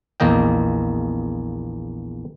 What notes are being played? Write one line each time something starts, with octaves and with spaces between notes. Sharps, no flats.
A#1 E2 A#3 D#5 G5